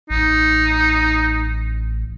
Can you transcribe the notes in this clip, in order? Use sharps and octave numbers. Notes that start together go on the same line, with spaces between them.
A1 D#4